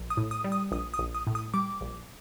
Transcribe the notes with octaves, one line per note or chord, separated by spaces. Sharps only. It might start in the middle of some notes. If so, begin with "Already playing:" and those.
Already playing: A#1
D#6
A2
D#6
G3
D#6
A#1 D#6
D#6
A#1
D#6
A2
D#6
G3 D6
A#1